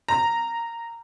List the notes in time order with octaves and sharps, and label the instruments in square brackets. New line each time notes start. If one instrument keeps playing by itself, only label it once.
[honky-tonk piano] A#5